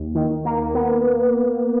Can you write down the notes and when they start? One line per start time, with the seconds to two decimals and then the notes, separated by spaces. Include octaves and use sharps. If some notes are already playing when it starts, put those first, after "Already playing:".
Already playing: D#2
0.15 D#3
0.45 A#3
0.74 B3